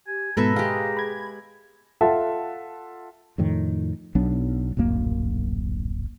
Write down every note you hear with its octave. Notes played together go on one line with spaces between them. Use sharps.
G4 G#5
G#2 B2 B3 A4 B4 E5 A#5
G#3 G4 G#4 F5
B5 G#6
F4 A4 E5 F#5 A5
F2 A2 D#3
B1 F#3 B3 D4
D1 A#1 F#2 A#3